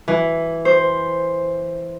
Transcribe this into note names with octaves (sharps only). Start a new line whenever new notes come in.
E3
C5